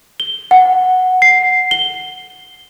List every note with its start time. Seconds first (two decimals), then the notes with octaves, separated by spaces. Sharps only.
0.20 G7
0.51 F#5
1.22 C7
1.71 G7